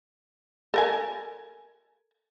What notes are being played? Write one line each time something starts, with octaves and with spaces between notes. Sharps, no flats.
A4 A#4 G#5